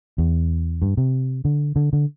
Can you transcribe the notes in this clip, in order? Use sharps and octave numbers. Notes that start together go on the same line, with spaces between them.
E2
G2
C3
D3
D3
D3